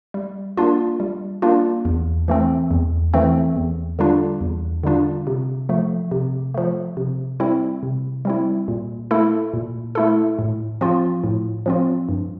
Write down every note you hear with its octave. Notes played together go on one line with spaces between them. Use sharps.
G3
A#3 D4 F4
G3
A#3 D4 F4
E2
E3 A3 C4
E2
E3 A3 C4
E2
D3 G3 D4 F4
E2
D3 G3 D4 F4
C3
F3 A3
C3
F3 A3
C3
G3 C4 E4
C3
G3 C4 E4
A#2
A3 E4 A4
A#2
A3 E4 A4
A2
F3 C4 F4
A2
F3 C4 F4
G2